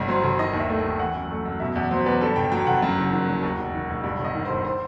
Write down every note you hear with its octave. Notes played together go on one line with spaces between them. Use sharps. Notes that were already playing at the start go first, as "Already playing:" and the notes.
Already playing: G1 G2 D#5
F#3 C5
G1
D#3 D#5
D#2
E5
A3
G5
D#2
E3 F#5
F#2
A3
F#2
B2 E5
E2
F#3 C5
E2 B4
G2 A4
G1 G5
F#3 G5
G1 F#5
F#2
F#1
D#3
F#3
D#2
E1
D#3
E1
G2
G1
D#5
D#3
G1 C5
C5